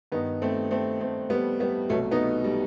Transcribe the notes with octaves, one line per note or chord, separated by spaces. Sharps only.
G2 D#3 B3 D#4
A3 C4
A3 C4
A3 C4
G3 B3
G3 B3
C2 B2 F#3 A3
B3 D#4
G3